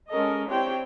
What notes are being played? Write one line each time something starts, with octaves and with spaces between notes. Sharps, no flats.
G#3 C#4 A4 A#4 D#5
C4 D4 E4 G4 C#5 G5